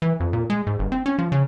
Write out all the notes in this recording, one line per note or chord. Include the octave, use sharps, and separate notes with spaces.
E3
F2
A#2
G#3
G#2
G1
C4
C#4
F3
C#3